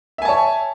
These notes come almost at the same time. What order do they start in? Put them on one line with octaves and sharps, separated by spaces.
E5 G#5 A5 C#5